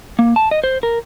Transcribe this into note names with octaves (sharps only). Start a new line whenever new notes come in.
A#3
A5
D#5
C5
A#4